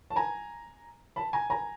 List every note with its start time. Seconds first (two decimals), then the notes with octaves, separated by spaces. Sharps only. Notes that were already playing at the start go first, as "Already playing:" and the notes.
0.10 A5
0.16 G#5 A#5
1.16 A5 B5
1.33 G#5 A#5
1.50 G#5 A#5